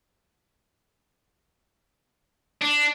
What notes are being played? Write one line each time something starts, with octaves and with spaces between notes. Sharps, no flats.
D4